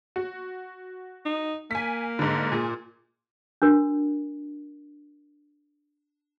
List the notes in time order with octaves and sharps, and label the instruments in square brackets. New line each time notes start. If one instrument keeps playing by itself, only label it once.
[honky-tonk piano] F#4
[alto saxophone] D#4
[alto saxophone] A#3 [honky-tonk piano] G#5 B6
[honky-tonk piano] G#2 D3
[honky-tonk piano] A#2 [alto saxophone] G#4
[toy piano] D4 F#4 A#4